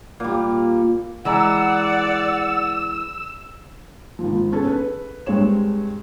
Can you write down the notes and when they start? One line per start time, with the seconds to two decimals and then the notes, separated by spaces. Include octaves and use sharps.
0.20 A#2 G3
1.25 E3 G#3 D5 F#5 A#5 E6
4.19 G#1 F3
4.52 B3 C#4 G#4 A4 B4
4.67 B4
5.26 G2 G#3 C4 G#4 C#5 E7